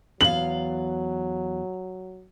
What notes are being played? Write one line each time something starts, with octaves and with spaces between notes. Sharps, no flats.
E2 F#3 F5 F#7